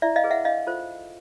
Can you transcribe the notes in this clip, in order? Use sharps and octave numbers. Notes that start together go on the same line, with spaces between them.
E4 D5 E5
D#5 F5
G#4 B4
E5 F#5
D4 D#5 F5
F4 A4 C5